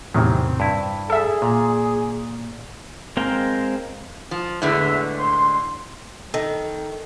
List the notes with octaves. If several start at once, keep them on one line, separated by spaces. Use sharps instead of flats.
E2 A2 C3 D#3 E3 F#3 C4
G2 E4
G#4 A4 E5
A#2
G#3 C4 A#4 F5 G5
F3
E2 A2 D3 G#3 E5
C6
D#3 A4